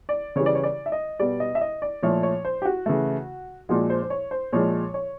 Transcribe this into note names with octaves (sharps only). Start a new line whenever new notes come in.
D5
C#3 E3 G3 C#5
D5
C#5
D5
E5
D#5
B2 G3 D5
D#5
E5
D#5
D5
A#2 F3 A3 C#5
C#5
C5
G4
F#4
C#3 E3 A3
A#2 F3 G#3 F#4
C5
C5
C#5
C5
A#2 F3 G#3 C#5
C#5